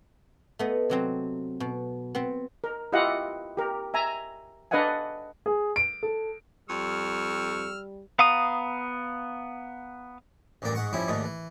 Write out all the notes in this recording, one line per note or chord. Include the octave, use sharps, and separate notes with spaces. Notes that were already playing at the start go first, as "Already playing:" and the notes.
A3 B3 D#5
C3 F#3 C4
B2
B3 C4
A#4
E4 F4 G4 D#5 F5 F#5
G4 A#4
E5 G#5 A#5
D4 B4 D#5 F5 F#5 G#5
G#4
D7
A4
F2 G3 C#6 E6 F6
B3 F5 A#5 D#6
A1 D2 G2 A#3 D5
G#2 F#5 C#6
G2 F3 G3 C#4 E4
D#2 G#2 D3 A3
E3